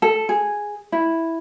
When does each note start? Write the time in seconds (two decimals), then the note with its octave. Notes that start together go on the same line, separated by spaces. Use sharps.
0.02 A4
0.29 G#4
0.92 E4